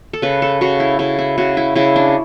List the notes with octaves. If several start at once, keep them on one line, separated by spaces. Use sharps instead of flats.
A4
C#3 B4
A4
C#3 F#4
E4
C#3 E4
E4
C#3 F#4
E4
C#3 E4
D4